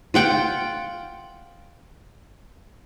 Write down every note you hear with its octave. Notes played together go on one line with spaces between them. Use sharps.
F4 F#5 G5